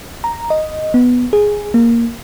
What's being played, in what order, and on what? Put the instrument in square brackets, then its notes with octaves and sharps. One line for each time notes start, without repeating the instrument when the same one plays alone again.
[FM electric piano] A#5
D#5
B3
G#4
A#3